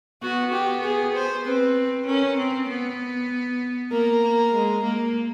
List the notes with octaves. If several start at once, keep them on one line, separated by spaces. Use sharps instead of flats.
B3 F#4
G4
G#4
C5
C4 B4
C#4 A#4
C4
B3
A#3 A#4
A#3
G#3
A#3